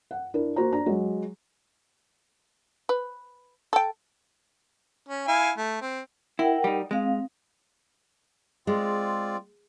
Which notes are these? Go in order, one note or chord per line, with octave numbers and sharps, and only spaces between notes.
F#5
D4 E4 A#4
A#3 F#4 C5 A#5
D4 A#5
F#3 G#3
B4
A4 G5
C#4
E4 F5 G#5
A3
C4
E4 A#4 F#5 G5
G3 D#4
G#3 C4 F5
G#3 C4 F4 D5